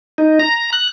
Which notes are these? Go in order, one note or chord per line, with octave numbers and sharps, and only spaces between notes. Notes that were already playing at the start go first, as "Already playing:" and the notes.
D#4
A#5
F#6